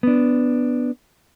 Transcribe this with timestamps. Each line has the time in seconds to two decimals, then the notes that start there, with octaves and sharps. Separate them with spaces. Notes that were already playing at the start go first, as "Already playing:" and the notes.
0.03 B3 D4